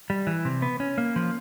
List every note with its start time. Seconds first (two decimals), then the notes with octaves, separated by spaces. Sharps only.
0.10 G3
0.27 E3
0.45 C3
0.62 B3
0.80 C#4
0.98 A#3
1.16 F3